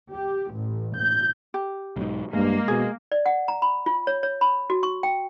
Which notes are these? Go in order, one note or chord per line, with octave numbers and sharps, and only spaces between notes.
G4
A1
G6
G4
B1 G#2
G2 G#3 A#3
B2 G#4
D5
F#5
A#5
B5
F4
C#5
C#5
B5
F#4
C#6
G5